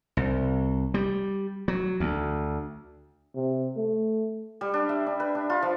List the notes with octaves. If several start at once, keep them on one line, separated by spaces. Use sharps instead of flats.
C2
G3
F#3
D2
C3
A3
G3
D4
E5
D4
B4
D4
F4
F3